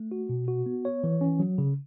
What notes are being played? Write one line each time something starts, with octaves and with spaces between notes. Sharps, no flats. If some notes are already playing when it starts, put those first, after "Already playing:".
Already playing: A3
F#4
B2
F#4
B3
C#5
E3
C#4
F#3
C#3